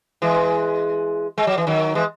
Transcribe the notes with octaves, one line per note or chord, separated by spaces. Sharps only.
E3 G#3
G#3
F#3
E3
D#3 F#3
E3 G#3